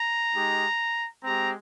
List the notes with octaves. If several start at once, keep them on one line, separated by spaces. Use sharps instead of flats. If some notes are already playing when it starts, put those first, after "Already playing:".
Already playing: A#5
G#3 D#4 G4
G#3 C4 G4 A#5